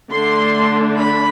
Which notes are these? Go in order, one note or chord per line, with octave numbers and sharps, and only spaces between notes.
D3 A3 D4 C6
B5